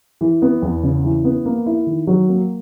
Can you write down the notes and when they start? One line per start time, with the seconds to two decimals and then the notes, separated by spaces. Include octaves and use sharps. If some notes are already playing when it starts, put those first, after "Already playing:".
0.21 E3
0.42 B3
0.62 E2
0.83 C#3
1.04 E3
1.25 B3
1.46 A#3
1.66 E4
1.87 D#3
2.07 F#3
2.29 A#3